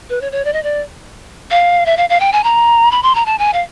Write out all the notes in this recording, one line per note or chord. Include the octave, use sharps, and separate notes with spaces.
B4
C#5
C#5
D5
D#5
D5
F5
E5
F5
F5
G5
G#5
A#5
B5
C6
A#5
A5
G#5
F5